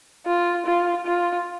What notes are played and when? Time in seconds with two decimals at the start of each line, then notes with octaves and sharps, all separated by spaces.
0.26 F4
0.66 F4
1.06 F4